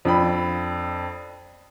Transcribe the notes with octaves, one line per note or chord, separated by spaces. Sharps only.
F2 D4 G5 B5